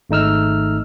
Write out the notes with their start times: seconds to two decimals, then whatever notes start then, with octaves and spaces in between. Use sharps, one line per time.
0.10 G#1 A3 D#4 E6 F6